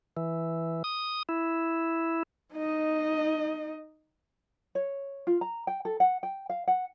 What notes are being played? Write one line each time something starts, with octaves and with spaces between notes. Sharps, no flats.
E3
D#6
E4
D#4 D#5
C#5
F4
A#5
G5
A4
F#5
G5
F5
F#5